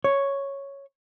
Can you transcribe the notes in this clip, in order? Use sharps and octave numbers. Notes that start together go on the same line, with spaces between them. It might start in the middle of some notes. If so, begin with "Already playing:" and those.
C#5